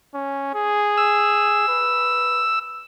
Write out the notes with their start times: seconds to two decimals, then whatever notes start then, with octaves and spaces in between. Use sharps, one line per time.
0.14 C#4
0.55 G#4
0.98 E6
1.69 B4